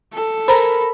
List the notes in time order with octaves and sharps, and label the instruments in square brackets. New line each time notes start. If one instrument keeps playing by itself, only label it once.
[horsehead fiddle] A4
[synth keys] A#4 B5 [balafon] C5 A#5